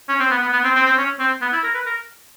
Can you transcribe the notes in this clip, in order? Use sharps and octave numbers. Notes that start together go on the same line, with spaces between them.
C#4
C4
B3
B3
B3
C4
C4
C4
C#4
C4
B3
E4
A#4
B4
A#4